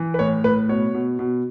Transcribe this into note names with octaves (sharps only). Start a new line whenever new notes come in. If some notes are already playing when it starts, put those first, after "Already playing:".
Already playing: E3
B4
A2 C#5
A2 B4
B2 C#5
B2
B2